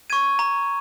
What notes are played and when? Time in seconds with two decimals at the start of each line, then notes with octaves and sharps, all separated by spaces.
0.10 C#6 G#6 D#7
0.39 A#5